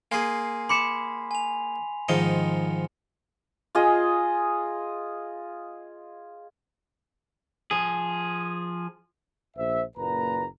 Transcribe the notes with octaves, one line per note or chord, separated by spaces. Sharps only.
A#3 G#4 G#5 C6 C7
B5 C6 D6 B6 C#7 E7
G#5 F7
G#2 D#3 F3 D#5 C#7
F4 G#4 D#5
F3 G#4
A#1 C5 E5
F#1 A#2 B4 A#5